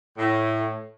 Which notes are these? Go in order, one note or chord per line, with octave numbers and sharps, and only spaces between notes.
A2